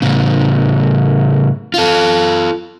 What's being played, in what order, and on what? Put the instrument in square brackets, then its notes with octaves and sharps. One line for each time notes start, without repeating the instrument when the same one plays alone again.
[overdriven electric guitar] A2 C#3
F4 A4